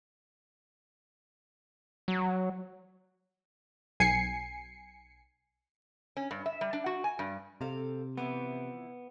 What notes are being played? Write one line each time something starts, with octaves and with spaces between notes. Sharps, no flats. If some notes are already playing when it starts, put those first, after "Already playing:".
F#3
B1 G#5 C7 C#7
C#4
G2
E5
G3
D4
F#4
G#5
G2
C3 C4 A4 F5
E3 F3 B3 E4